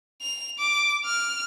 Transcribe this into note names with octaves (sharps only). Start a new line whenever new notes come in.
F7
D6
F6